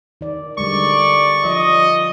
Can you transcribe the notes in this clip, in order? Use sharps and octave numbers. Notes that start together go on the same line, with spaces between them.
D#3 D5
D3 G3 G#3 D5 C#6
F3 D5 D#5